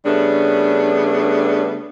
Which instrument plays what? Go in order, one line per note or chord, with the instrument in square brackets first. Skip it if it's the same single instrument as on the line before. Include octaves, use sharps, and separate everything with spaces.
[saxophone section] C#3 G3 A3 B3 D4